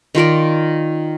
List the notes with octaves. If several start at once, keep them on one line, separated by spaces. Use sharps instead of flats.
D#3 F4 A#4 D5